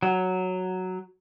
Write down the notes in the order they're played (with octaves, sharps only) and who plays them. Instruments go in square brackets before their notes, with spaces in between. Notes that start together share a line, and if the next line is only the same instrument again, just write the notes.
[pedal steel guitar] F#3